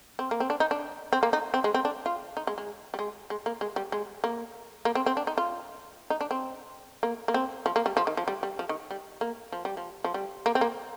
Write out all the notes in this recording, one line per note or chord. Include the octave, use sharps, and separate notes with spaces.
C4
A#3
C4
D4
D#4
D4
C4
A#3
D#4
C4
G#3
C4
D4
F4
D#4
G#3
G#3
G3
G#3
G#3
A#3
G#3
G3
G#3
A#3
A#3
C4
C4
D4
D#4
F4
D#4
D4
C4
A#3
A#3
C4
F3
A#3
G3
F3
D#3
F3
G3
G3
F3
D#3
G3
A#3
F3
G3
F3
F3
G3
A#3
C4
A#3